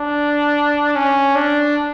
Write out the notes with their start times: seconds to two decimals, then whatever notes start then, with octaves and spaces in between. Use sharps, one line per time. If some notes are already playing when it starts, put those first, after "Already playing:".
Already playing: D4
0.96 C#4
1.35 D4